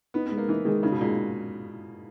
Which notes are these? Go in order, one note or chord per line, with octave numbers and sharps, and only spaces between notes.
B3 D#4
B3
G#3
A#3
E3 D#4
D#3 G#3
C#3 D#4
B2
A#2 G#3